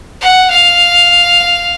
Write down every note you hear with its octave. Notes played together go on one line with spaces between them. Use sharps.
F#5
F5